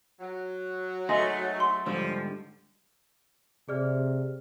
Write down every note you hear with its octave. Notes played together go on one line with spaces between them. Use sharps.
F#3
A3 D#4 G#4 D#5 C6 A#6
C6
G#2 D3 F3 G3
C3 G#4 D5 F6